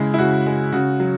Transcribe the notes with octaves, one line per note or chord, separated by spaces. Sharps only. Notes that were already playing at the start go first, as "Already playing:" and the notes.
Already playing: C#3 G#3 E4
E4
C#3 F#4
G#3
C#3 F#4
F#3